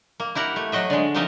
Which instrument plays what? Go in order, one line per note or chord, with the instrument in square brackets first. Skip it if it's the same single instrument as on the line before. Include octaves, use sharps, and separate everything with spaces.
[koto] A#3
E4 G4 A#4 F#5
A3
F#3 F#4 D#5 E5
D3 G#3
F3 C4 D#4 A#4 D#5 E5